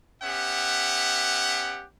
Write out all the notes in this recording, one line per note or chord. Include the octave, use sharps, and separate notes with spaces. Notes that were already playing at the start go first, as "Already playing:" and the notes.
B3 C#4 G4 E5 F#5